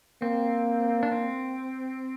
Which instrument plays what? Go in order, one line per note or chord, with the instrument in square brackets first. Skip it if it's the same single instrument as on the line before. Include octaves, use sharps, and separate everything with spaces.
[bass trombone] A#3 [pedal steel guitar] C4
[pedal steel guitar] D4
C4